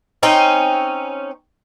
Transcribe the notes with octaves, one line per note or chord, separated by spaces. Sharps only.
C4 C#4 D#4 G5